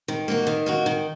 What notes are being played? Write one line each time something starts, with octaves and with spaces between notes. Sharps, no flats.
D#3
A#3 D#4 F#4
D#3
A#3 D#4 F#4
D#3